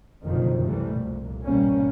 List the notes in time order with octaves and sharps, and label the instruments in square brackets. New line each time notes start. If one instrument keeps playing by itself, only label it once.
[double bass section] F#1 F2 B2 D3 D#3 F3
C2 C3 E3 G3 A3
C2 F2 A#2
G#1 B2 G3 A#3 C#4